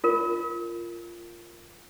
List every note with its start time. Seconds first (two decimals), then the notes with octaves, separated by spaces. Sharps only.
0.04 F4 A#4